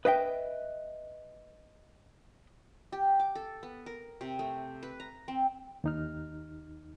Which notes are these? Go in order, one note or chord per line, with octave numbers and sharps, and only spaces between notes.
B4 D#5 E5 G5
G4
D6
A4
B3
A#4
C3
A3
B4
A#5
C4
D#2 D#4 F6